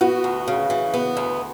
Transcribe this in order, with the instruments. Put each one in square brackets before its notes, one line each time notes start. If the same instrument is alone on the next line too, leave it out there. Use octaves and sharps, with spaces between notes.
[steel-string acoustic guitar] B3 [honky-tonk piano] F#4
[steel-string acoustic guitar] D2
C#3
E3
B3
D2